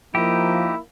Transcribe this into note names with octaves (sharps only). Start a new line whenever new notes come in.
F3 A#3 D#4 E4 G4